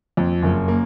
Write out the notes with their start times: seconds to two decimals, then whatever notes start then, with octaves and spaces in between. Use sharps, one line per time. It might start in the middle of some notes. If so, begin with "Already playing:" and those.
0.17 F2
0.42 F#1
0.68 A#3